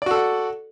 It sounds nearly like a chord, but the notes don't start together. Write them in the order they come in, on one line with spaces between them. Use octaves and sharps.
D5 F#4 A4 F#5